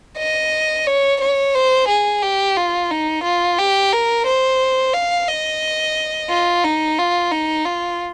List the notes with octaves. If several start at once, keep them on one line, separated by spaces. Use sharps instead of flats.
D#5
C#5
C#5
C5
G#4
G4
F4
D#4
F4
G4
A#4
C5
F5
D#5
F4
D#4
F4
D#4
F4